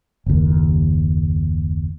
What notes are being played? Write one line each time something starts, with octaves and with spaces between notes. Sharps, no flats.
F#1 D#2